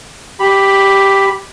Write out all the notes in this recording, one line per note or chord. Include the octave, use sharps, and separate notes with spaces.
G4 B5